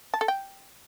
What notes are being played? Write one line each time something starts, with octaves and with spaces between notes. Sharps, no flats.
A5
A4
G5